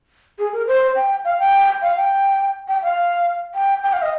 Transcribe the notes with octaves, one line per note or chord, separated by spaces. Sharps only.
G#4
A#4
C5
G5
F5
G5
F5
G5
G5
F5
G5
G5
F5
D#5